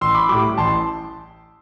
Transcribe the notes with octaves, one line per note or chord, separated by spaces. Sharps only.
A1 C6 E6
B5 D6
A2 G3 B5 D6
A1 A5 C6